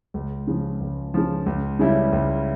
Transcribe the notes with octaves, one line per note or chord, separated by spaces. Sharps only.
C#2
C#3 F3
C#2
C#3 F3
C#2
C#3 G3 C#4 E4
C#2